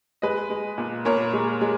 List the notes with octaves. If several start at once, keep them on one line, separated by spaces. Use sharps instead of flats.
G#3 B4 D#5
G#3
A#2
A#2 A#4 C#5
G#3
G#3